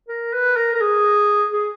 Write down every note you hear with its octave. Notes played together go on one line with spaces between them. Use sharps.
A#4
B4
A#4
A#4
G#4
G#4